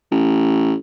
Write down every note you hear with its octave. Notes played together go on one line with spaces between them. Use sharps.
A1